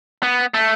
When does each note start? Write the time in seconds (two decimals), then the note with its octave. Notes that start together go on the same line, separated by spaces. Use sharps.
0.23 B3
0.54 A3